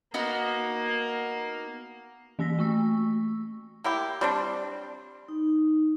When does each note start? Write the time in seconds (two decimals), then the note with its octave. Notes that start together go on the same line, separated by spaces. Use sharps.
0.14 A#3 B3 D#4 F#4
2.39 E3 A#3 E6 A#6 B6
2.59 A3 C#6 E6
3.84 A#3 E4 G4
4.21 G3 C4 D4
5.28 D#4